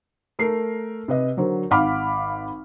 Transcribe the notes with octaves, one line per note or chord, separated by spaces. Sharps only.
A3 A#4 C7
C3 B4 D#5
D3 F#3 A#4 C5
G#1 F5 F#5 B5 D6 F6